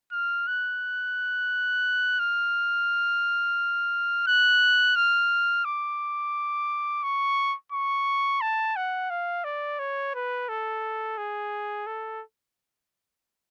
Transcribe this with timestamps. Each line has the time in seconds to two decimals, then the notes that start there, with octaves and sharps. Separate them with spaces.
0.12 F6
0.47 F#6
2.19 F6
4.27 F#6
4.96 F6
5.65 D6
7.03 C#6
7.72 C#6
8.41 A5
8.76 F#5
9.10 F5
9.45 D5
9.79 C#5
10.14 B4
10.49 A4
11.18 G#4
11.87 A4